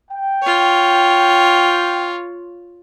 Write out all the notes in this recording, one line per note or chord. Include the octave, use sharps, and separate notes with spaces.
G5
F4 C#5